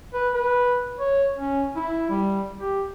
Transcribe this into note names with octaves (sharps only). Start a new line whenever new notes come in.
B4
B4
C#5
C#4
E4
G3
G4